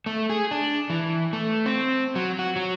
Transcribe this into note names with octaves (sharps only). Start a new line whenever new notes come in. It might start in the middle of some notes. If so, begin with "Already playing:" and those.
A3
G#4
D4
E3
A3
C4
F#3
F#4
F#3